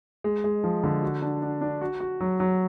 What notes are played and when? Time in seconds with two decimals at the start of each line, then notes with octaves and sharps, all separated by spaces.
0.24 G#3
0.44 G#3
0.64 F3
0.84 D3
1.02 F#4
1.22 D4
1.42 D4
1.61 D4
1.81 F#4
2.00 F#4
2.20 F#3
2.40 F#3